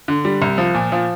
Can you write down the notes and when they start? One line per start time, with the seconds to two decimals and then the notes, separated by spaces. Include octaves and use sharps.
0.08 D3
0.25 G3
0.42 C2
0.58 F3
0.75 A#2
0.92 F3